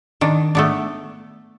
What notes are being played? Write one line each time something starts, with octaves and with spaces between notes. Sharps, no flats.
D#3 D4
A3 B3 D4